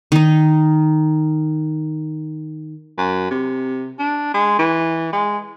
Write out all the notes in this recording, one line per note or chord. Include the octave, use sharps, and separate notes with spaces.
D#3 D#4
F#2
C3
D4
G#3
E3
G#3